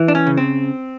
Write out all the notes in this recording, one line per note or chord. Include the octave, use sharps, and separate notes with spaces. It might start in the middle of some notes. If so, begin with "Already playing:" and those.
Already playing: E3
D4
C#4
C#3
C4